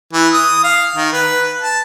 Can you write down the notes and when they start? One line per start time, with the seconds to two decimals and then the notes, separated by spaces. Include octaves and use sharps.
0.13 E3
0.33 D#6
0.64 F5
0.96 D#3
1.13 B4
1.61 A5